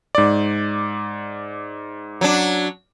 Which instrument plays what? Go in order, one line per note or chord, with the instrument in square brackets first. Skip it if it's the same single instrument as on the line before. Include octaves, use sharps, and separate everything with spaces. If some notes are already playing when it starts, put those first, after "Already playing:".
[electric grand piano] G#2 D5
[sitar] F#3 D4